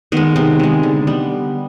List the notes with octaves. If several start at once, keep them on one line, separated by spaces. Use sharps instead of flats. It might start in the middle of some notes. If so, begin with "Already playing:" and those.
D#3 G#3 B3
C3 B3
D#3 G#3
D3
G3 B3